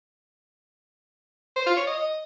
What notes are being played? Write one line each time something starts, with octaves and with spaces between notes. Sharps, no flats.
C5
F4
C#5
D#5